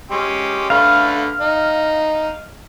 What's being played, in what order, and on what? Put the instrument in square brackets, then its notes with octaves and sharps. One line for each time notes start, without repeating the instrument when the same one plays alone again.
[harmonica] G#3 C#4 G4
[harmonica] D3 A3 B4 [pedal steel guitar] F5
[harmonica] D#4